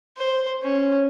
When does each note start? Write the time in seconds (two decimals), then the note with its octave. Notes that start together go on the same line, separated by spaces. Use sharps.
0.17 C5
0.63 C#4